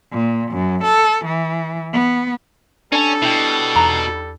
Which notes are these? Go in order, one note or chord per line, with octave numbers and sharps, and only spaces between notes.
A#2
F#2
A4
E3
B3
G3 C#4 D4 A4 C#5 A5
B2 E4 G5
E2 D#4 A#5 B5